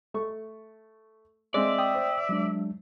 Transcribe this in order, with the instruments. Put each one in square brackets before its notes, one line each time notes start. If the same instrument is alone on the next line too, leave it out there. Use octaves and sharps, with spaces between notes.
[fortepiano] A3 C#6
[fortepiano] G#3 C4 [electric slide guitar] D5 [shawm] E5
[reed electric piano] G5 D#6
[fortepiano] C5
[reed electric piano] F#3 G#3 D4